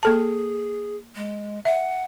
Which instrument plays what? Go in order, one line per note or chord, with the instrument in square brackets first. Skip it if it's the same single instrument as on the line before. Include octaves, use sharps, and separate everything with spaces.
[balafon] A#3 A4 A5 [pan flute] G#4
[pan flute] G#3
[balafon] E5 [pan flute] F#5